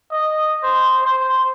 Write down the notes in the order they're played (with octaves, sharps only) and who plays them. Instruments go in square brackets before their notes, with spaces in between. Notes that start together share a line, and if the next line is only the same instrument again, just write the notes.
[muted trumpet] D#5
C5
C5